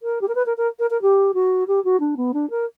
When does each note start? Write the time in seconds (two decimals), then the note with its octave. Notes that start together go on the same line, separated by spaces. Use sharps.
0.02 A#4
0.21 G4
0.28 A#4
0.35 B4
0.46 A#4
0.57 A#4
0.79 A#4
0.90 A#4
1.02 G4
1.34 F#4
1.67 G4
1.84 F#4
2.00 D4
2.17 B3
2.33 D4
2.50 A#4